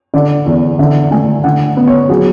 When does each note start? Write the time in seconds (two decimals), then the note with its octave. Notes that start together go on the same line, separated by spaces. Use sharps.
0.14 D3 D5
0.46 E2
0.79 D3 E5
1.11 A3 G#5
1.44 D3 F#5
1.77 B3
1.87 C#5
2.09 F#3 G#4